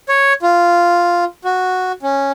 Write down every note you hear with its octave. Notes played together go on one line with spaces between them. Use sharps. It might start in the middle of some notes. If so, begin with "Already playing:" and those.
C#5
F4
F#4
C#4